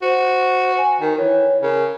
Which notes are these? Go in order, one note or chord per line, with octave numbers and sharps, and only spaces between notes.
F#4 C5
G#5
D#3 A#4
E3 C#5
C#3 A#4